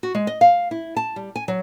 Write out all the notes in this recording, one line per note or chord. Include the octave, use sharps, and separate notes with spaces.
F#4
G#3
D#5
F5
E4
A5
G3
G#5
F#3